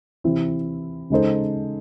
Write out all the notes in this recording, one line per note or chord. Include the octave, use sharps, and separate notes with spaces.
C3 E3 C4 E4
C#3 G#3 D#4 A4 C5